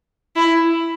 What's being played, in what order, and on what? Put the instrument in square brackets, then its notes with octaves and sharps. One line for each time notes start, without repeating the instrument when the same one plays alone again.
[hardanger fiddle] E4